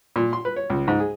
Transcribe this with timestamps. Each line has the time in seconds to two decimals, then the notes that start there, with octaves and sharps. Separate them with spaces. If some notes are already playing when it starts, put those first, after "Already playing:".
0.16 A#2
0.33 C6
0.45 B4
0.56 C#5
0.70 C#2
0.88 G#2
1.00 G#4